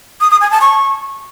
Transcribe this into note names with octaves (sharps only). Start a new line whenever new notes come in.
D#6
D#6
G#5
A5
C#6